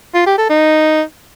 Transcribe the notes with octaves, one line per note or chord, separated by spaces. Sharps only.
F4
G4
A4
D#4